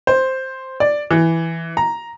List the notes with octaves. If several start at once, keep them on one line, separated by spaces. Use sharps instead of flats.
C5
D5
E3
A#5